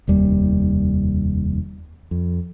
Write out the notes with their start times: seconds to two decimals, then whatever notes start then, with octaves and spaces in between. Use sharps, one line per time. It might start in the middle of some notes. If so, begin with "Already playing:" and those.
0.08 F1 D#2 G3
2.11 F2